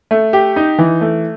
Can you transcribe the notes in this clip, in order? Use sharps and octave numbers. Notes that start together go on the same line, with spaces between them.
A3
G4
D#4
E3
A3